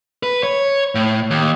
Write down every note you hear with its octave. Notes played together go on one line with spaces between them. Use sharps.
B4
C#5
A2
D#2